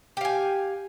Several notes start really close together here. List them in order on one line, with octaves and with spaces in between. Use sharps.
G4 F5 G#5